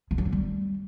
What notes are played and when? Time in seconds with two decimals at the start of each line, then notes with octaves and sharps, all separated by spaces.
0.11 G#3
0.18 F#3
0.25 C4
0.33 G3